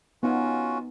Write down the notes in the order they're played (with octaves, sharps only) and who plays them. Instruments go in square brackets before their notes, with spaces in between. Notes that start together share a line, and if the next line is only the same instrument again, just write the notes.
[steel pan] B3 D#4 G#5 [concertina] C#4 F4 F#4